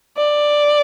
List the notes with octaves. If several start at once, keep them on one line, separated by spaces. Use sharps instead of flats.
D5